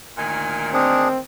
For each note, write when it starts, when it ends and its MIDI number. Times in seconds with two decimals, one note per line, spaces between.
0.18 1.23 38
0.18 1.23 46
0.18 1.23 51
0.18 0.70 80
0.73 1.19 60
0.73 1.08 62
0.73 1.08 68